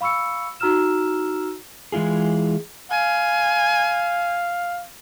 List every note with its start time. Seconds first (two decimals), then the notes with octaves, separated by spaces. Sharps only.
0.01 F5 B5 C#6 E6 C#7
0.60 D#4 F#4 A#5 E6 F6 E7
1.92 E3 G#3 E4 F4 G#4
2.91 F5 G#5